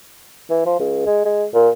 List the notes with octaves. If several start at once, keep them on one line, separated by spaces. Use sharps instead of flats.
E3
F3
C#2
G#3
G#3
A#2